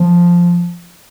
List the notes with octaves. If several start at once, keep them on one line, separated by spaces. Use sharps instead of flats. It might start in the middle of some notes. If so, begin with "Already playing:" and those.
Already playing: F3